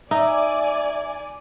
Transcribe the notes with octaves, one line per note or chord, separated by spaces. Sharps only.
D#4 D5 E5 G#5